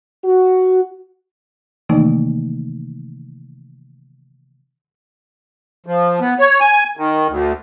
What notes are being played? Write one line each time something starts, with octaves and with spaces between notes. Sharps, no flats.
F#4
C3 D#3 E3 A3 A#3 D#4
F3
B3
C#5
G#5
D#3
D2